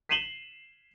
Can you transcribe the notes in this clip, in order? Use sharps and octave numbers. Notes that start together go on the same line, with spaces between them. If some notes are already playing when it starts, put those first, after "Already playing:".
B6 C7 D#7 E7 F#7 G7